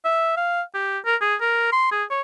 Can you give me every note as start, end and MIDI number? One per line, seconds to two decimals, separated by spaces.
0.05 0.35 76
0.37 0.61 77
0.74 0.99 67
1.05 1.16 70
1.21 1.35 68
1.41 1.72 70
1.72 1.91 84
1.91 2.04 68
2.10 2.21 73